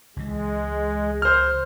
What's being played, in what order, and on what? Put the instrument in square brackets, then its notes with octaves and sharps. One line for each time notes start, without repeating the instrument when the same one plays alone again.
[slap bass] C#2 E3 [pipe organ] G#3
[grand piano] C5 F6